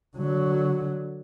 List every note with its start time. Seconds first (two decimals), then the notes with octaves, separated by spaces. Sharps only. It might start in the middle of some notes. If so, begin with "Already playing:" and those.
0.17 D3 F#3